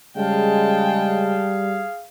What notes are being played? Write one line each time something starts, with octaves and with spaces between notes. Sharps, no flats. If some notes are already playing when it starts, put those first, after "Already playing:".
C#3 G3 G#3 G#4 F5 G5 A5